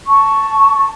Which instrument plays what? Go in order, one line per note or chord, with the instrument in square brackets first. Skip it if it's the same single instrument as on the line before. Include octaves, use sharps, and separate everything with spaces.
[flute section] A5 C#6